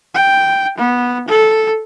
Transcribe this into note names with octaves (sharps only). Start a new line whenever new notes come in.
G5
B3
A4